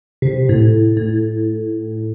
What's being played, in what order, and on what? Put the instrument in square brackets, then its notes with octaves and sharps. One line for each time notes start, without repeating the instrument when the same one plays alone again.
[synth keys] C3
A2
A2